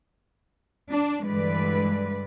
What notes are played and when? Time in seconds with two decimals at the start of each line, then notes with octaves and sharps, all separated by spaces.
0.90 D4
1.25 G2 D3 E3 G#3 B4 D5